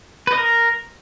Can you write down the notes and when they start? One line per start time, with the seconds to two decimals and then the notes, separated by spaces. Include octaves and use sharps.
0.27 B4
0.32 D#5
0.37 A#4